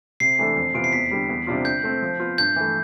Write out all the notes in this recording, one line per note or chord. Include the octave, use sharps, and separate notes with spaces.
C3 C7
E3 A3 D4 A4
F2
C3 E3 B3 F4 D7
C7
E2 B6
D3 G3
E2
C3 G3 D4 F4
D3 G6
A3 C4
F3
B3 F4
G2 G6
E3 A3